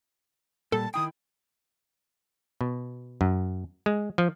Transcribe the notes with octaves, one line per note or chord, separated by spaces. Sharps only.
A#2 G3 A4 A5
D#3 E4 G5 D#6
B2
F#2
G#3
F3